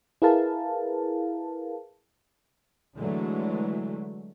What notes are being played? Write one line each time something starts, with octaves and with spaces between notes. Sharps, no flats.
E4 G#4 A#4 B4 F5 A5
D3 E3 F#3 G#3 A3